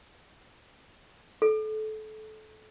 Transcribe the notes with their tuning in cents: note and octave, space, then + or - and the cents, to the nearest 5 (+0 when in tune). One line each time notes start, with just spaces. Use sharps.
A4 -25